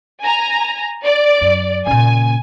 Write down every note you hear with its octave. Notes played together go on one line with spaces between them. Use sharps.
G#5 A#5
D5 D7
F#2
A#2 C#3 G#5